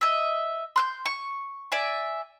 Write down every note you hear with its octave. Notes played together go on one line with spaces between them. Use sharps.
D#5 E5
C6 F#6 G6
C#6
D5 E5 G#5